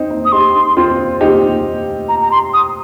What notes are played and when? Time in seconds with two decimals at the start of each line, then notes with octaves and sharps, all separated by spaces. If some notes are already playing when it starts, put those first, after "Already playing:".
Already playing: C4 D#4
0.10 D#4
0.25 D#6
0.32 D#4 G4 C6
0.77 C4 F4
1.21 D#4 G4
2.09 A#5
2.22 A#5
2.32 C6
2.54 D#6